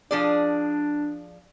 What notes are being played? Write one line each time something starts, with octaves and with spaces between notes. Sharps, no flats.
F3 D4 G#4 D5